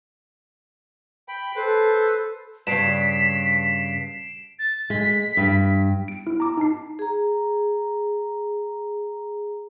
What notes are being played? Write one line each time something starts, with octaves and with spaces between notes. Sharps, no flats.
G5 B5
A4 B4 C5
G2 C#3 B6 C7 D7 E7
A6
G#3 B6
G2
D7
E4
A#5 D6
D#4 A5 C7
G#4 A#5